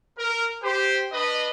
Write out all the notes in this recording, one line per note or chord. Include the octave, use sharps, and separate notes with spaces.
A#4
G4 C5
D4 B4 D#5